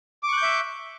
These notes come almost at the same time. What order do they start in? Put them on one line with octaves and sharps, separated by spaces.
D6 C#6 F#6 G6 E5